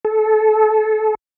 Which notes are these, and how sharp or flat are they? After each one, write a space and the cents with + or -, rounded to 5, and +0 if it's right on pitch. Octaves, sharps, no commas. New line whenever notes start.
A4 -25